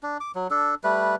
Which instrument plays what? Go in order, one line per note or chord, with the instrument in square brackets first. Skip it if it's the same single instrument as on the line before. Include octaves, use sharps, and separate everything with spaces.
[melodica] D4
D6
F#3
D4 A4
G3 A3 B4